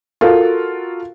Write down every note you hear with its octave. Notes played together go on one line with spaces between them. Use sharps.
F4 F#4 A4 A#4 F5